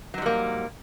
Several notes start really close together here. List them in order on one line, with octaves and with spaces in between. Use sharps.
F#3 G#2 G3 A#3